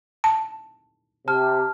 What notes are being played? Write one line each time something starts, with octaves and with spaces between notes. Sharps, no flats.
A5
C3 A5 F6